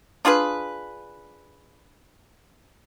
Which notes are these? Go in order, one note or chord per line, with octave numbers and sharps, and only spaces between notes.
D4 F4 G#4 B4